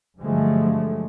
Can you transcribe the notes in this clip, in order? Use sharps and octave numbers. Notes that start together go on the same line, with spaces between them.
G2 D3 F3 F#3 G#3 A3